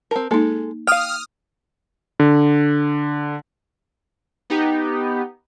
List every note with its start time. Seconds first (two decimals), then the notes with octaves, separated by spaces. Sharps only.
0.11 C4 A#4 A5
0.31 G#3 A#3 D#4 A4
0.87 F5 G5 D#6 F6
2.20 D3
4.50 B3 D#4 G4